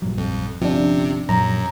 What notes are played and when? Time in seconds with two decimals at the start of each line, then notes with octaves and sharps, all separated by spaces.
0.02 A#1 G2 F#3
0.18 F2
0.62 G1 C3 F3 C#4 D4
1.29 F#2 A#2 F3 F#3 A#5